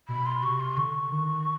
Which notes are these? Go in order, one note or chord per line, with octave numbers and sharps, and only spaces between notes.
B2 B5
C6
C3 C#6
C6
D3 C#6
D#3